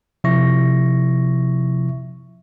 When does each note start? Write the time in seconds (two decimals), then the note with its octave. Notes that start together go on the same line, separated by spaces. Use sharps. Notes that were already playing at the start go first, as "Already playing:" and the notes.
0.24 C3 F3 E4 E5 C#6 A#6